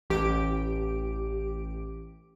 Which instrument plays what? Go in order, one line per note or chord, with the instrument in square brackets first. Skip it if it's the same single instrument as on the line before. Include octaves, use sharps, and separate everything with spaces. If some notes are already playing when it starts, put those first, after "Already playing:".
[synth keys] A1 G4 D7